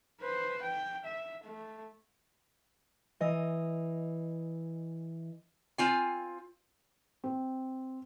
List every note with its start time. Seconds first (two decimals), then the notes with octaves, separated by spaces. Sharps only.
0.21 B4 C5
0.62 G5
1.05 E5
1.44 A3
3.20 E3 D#5
5.78 C4 F4 G#5
7.24 C4